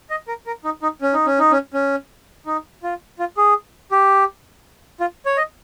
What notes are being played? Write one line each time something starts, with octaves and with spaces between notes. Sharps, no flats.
D#5
A#4
A#4
D#4
D#4
C#4
D#4
C#4
D#4
C#4
C#4
D#4
F4
F4
G#4
G4
F4
C#5
D#5